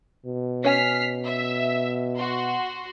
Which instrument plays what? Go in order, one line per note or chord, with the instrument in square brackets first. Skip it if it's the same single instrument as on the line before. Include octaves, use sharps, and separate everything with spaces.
[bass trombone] B2
[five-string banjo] C#4 G#5 [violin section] F6 B6 C7
[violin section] E5
F#4 C6